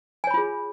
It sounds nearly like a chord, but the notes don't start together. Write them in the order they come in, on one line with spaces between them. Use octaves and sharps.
G#5 C#5 B5 F4 G#4